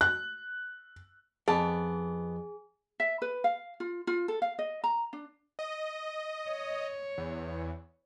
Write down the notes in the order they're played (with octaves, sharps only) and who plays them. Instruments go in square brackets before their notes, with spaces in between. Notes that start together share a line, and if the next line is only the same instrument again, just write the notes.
[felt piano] F#6
[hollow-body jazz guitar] F2 [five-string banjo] B3 A4 A5 [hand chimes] G#4
[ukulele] E5
B4
F5
F4
F4
A4
F5
D#5
A#5
D4
[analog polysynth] D#5
[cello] C#5
[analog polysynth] E2